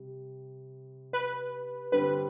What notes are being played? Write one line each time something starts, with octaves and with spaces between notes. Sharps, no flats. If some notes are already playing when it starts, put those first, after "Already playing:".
Already playing: C3 G3
B4
G2 D3 G3 C4 B4